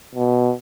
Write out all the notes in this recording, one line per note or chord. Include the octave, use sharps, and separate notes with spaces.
B2